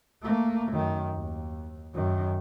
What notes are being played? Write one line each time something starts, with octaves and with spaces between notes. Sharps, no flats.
A3 A#3
F#2 D#3
D#2
F#2 D#3